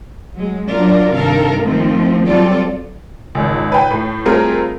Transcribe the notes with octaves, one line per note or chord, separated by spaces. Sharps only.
F#3 G#3
F#3 D4 F4 A#4 D5
G2 C3 D#3 A4 A#4 F5
D#3 F3 A3 C4
F#3 G3 C4 F4 A4 D5
G#1 C#2
B4 G5
A2
G3 A3 C4 F4 G#4 A#4